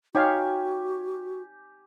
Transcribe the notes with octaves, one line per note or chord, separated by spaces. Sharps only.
D#4 F#4 G4 C#5 F5 G#5